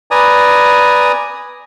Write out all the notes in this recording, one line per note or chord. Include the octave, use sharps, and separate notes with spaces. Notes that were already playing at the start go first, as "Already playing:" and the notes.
B4 D5 G#5 A#5 D#6